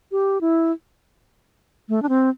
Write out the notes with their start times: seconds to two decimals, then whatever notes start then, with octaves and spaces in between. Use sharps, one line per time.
0.12 G4
0.41 E4
1.89 A3
2.02 D4
2.09 C4